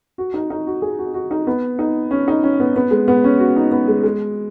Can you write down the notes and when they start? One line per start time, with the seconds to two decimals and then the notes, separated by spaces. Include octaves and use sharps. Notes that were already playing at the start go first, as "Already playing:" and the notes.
0.18 F#4
0.34 D#4
0.50 D#4
0.67 F#4
0.82 G#4
0.99 F#4
1.14 F#4
1.31 D#4
1.47 B3
1.79 D#4
2.11 C#4
2.28 D#4
2.43 C#4
2.60 B3
2.76 B3
2.91 G#3
3.08 B3
3.24 C#4
3.40 F#4
3.56 D#4
3.72 B3
3.88 G#3
4.03 G#3